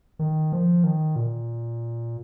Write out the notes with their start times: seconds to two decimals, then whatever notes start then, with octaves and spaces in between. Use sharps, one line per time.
0.19 D#3
0.52 F3
0.84 D#3
1.16 A#2